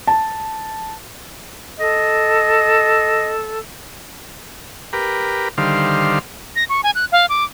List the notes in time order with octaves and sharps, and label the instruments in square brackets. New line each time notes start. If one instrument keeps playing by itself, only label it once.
[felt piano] A5
[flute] A4 [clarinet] D#5
[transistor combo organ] G4 A#4 B4
D3 D#3 G3 C5 F5
[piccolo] A#6
C#6
G#5
F#6
F5
D6